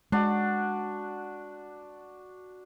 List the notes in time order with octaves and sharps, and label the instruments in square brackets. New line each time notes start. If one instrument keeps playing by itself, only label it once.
[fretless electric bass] G#3 [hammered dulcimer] D4 F#4